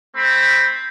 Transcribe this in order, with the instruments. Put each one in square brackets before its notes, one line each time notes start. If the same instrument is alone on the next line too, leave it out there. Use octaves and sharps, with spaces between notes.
[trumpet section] A3 C4 B5